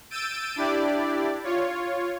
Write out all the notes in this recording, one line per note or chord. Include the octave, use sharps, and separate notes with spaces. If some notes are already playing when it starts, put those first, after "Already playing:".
E6 G6 A6 D7 D#7
D4 E4 G4 D5
F4 C#5